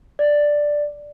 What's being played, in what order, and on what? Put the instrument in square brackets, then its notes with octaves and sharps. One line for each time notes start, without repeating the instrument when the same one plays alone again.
[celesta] D5